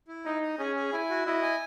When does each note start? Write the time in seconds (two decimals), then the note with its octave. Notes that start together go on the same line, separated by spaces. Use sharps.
0.08 E4
0.25 D#4 D#5
0.43 D#5
0.58 C#4 G#4
0.76 G#4
0.93 E4 G#5
1.10 F#4
1.26 E4 D#5
1.42 G#5